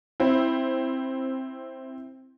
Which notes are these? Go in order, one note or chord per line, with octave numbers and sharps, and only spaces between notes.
C4 E4